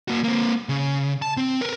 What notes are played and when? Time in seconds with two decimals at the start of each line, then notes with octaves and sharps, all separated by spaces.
0.08 A#3 F#4
0.24 A#3 C4
0.69 C#3
1.22 A5
1.37 C4
1.61 A#4 B4